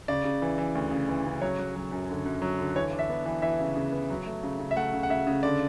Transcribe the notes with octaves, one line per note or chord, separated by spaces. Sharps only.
C#3 D5
C#3
E3
E3
D2
C#3
E3
C#3
F#3 C#5
F#3
F#3
F#2
D3
F#2
F#3
D3
E3 C#5
D4
E5
B3
E3
E3 E5
C#3
C#3
B3
F#3
A3
C#3
C#3
E5
A3 F#5
C#3
F#5
C#3 E5
C#3
D3 D5